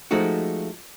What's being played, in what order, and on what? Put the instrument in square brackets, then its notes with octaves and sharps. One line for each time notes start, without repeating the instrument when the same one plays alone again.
[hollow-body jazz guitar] F3 G#3 A3 D#4 F#4